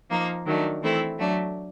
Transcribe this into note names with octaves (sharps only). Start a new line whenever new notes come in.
F3 A#3 D#4
D#3 F#3 A3 D4
E3 A3 C4 E4
F#3 A3 D4